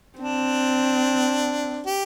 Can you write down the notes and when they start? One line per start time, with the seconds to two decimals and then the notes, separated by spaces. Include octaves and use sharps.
0.19 C4 D4
1.86 G4